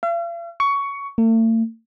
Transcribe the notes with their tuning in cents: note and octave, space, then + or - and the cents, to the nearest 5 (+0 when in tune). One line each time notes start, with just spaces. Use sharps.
F5 -45
C#6 +15
A3 +45